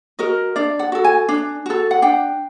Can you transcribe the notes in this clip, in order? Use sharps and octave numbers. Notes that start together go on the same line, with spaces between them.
F#4 A#4 D#5
D4 D5
F#5
F#4 A4
G#5
D4
F#4 A4
F#5
D4 G5